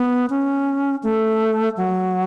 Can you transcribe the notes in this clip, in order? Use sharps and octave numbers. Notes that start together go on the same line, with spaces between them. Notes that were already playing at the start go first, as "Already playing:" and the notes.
Already playing: B3
C#4
A3
F#3